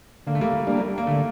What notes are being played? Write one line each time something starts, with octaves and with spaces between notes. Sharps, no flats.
D3 A#3
A3
G3 A#3
G3 A#3 D4
A#3
D3 A3